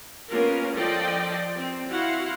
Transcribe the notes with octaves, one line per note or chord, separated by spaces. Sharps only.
A#3 B3 C#4 F4 A#4
F3 A4 D5 D#5 G5 C6
C4
E4 F#4 F5 F#5 C6